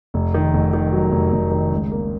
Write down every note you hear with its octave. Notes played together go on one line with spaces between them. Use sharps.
F1
D#3
F1
D#3
F#3
F1
F1
D#3
C#2
A#3